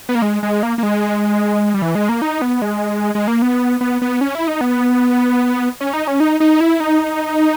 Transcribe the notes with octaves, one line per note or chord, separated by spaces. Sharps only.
B3
A#3
G#3
G#3
A#3
A#3
G#3
G3
E3
G#3
A#3
D#4
B3
G#3
G#3
A#3
B3
B3
B3
C#4
E4
D#4
B3
C#4
D#4
C#4
D#4
D#4
E4
D#4